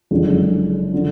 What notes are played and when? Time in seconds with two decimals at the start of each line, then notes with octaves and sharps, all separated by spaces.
0.11 F#1 F2 D3 G#3
0.94 D3